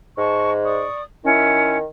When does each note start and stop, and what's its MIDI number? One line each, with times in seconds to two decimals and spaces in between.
0.18 0.84 44
0.18 0.51 81
0.18 0.51 85
0.64 1.02 74
0.64 1.02 85
0.64 1.02 87
1.25 1.84 51
1.25 1.78 61
1.25 1.78 64